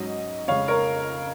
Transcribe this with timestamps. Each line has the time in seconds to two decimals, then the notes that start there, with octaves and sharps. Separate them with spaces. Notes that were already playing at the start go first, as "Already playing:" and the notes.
Already playing: G#2 F#3 C#4 D#5
0.48 F2 C#3 G#3 C#5 F5
0.68 A#4 C#5